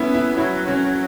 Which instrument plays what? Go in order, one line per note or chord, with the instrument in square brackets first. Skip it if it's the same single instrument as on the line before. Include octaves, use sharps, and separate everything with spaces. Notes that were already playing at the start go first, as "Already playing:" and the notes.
Already playing: [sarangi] B3 [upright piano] C#4 E4
[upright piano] E4
[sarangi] F#3 [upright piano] E4
[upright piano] C#4